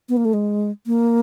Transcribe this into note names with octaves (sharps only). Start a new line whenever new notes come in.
B3
A#3
A3
G#3
A#3